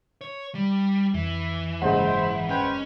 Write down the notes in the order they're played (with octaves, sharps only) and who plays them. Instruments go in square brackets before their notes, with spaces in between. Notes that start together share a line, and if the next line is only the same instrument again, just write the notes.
[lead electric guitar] C#5
G3
[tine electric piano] F2 [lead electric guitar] E3
[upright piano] F#1 G#3 [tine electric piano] G#2 E5 F#5 [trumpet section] E4 C5
[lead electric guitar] C#4 [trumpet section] B4 C5 G5